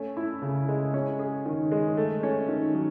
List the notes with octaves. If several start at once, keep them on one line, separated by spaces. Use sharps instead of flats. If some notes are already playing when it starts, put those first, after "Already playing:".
Already playing: A3 C#4
E4
C#3
G#3
C#4
G#4
D#3
G#3
A3
C#4
D#3
F#3